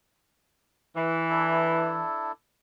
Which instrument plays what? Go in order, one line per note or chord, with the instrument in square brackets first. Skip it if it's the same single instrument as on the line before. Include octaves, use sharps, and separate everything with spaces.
[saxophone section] E3
[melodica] D4 E4 A4